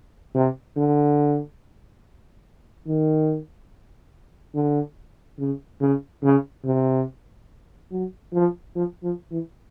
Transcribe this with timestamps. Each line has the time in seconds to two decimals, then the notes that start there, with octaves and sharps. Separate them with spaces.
0.35 C3
0.77 D3
2.87 D#3
4.55 D3
5.39 C#3
5.81 C#3
6.23 C#3
6.65 C3
7.91 F#3
8.33 F3
8.75 F3
9.03 F3
9.32 E3